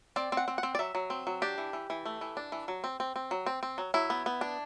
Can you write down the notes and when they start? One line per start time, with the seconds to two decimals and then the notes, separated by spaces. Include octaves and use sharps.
0.16 C4 D5
0.32 C4
0.37 F#5
0.48 C4
0.58 F#5
0.63 C4
0.75 D5
0.79 F#3 E5
0.95 F#3
1.10 C4
1.27 F#3
1.42 D4 G4
1.58 E3
1.73 E3
1.90 E3
2.06 A3
2.21 E3
2.37 D4
2.52 E3
2.68 F#3
2.84 C4
3.00 C4
3.16 C4
3.31 F#3
3.46 C4
3.63 C4
3.78 F#3
3.94 F#3 E4
4.10 B3
4.26 B3
4.41 D4